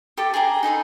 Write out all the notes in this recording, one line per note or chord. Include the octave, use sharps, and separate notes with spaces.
G4 A4
G#4 G5 A5 A#5
D#4 G#4 A4 B5